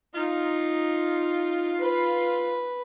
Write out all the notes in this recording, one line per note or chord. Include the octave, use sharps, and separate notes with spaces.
D#4 F4
B4